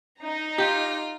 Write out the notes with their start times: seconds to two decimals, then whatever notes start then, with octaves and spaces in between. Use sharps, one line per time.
0.20 D#4 A#5
0.58 F4 G4